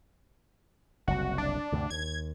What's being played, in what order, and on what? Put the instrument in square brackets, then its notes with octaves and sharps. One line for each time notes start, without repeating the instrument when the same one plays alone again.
[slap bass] F#1 C2 [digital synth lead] F#4
[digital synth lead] D4
[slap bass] D2 G2 C3
[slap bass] D#2 [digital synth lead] G#6